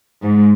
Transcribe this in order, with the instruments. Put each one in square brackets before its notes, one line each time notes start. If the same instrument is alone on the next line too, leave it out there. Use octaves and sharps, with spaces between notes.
[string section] G#2